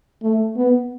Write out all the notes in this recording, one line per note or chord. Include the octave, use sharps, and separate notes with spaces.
A3
B3